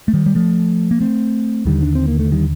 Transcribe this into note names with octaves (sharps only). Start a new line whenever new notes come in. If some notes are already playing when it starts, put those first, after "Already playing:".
A3
D#3 G3
G3
F3 A3
A#3
A3 C4
D#2 D3 D#3 G3
D4
C4
A#3
A3
D#3 G3